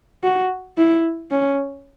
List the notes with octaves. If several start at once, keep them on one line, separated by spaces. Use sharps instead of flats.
F#4
E4
C#4